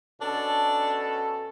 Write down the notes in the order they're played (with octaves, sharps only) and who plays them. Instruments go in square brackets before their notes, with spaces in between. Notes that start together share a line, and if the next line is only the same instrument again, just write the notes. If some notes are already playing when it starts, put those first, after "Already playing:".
[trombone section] B2 C#4 A4 [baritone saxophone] D4